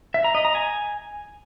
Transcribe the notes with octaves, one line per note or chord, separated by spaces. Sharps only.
E5
A#5
D#5
A#5
G#5